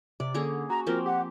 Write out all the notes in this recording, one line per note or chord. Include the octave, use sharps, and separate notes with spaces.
C3 D5
D3 A#3 C#4 G#4
F#4 A#5
F3 A#3 C4 A#4
G4 F#5